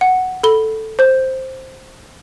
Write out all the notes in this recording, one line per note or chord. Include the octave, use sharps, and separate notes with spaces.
F#5
A4 B5 G7
C5 G6